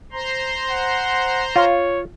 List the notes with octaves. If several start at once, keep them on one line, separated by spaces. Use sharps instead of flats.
C5 A#5 C6
F#5
F4 C#5